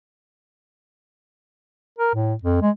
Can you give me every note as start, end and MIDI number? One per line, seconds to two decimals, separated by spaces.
1.99 2.11 70
2.14 2.34 45
2.43 2.58 41
2.62 2.70 56